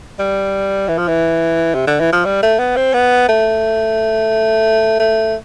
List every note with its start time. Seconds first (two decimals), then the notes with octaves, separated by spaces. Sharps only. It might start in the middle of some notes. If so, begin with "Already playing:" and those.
0.19 G3
0.88 E3
0.98 F3
1.08 E3
1.74 C3
1.87 D3
2.00 E3
2.13 F3
2.25 G3
2.43 A3
2.59 B3
2.76 C4
2.94 B3
3.29 A3
5.00 A3